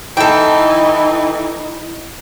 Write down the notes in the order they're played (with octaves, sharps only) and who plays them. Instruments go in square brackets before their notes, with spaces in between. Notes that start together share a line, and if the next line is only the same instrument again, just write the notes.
[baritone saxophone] E3 [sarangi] D#4 [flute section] E4 [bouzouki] A4 G5